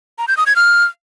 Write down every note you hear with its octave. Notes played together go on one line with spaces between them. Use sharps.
A#5
G6
D#6
G#6
F6